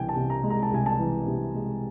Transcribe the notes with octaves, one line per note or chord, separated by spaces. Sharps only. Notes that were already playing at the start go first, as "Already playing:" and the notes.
Already playing: C2 E3 G5 G#5
A5
C3
A#5
G#3
A#5
A5
C2 G#5
A5
E3
C3
G#3